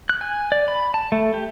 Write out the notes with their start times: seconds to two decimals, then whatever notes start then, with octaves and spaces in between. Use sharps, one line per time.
0.09 F#6
0.21 G#5
0.52 D5
0.68 B5
0.94 A5
1.12 A3
1.34 G4